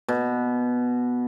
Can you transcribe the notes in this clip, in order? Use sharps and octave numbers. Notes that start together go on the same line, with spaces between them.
B2